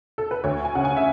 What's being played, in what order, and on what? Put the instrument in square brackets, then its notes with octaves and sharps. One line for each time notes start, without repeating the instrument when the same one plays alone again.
[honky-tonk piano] A4
B4
D2 C#5
G#5
C#3 F#5
G#5
E5